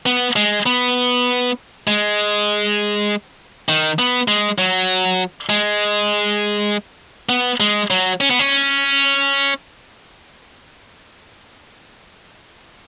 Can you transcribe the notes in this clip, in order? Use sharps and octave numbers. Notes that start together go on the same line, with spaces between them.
B3
G#3
B3
G#3
D#3
B3
G#3
F#3
G#3
B3
G#3
F#3
C#4
B3
C#4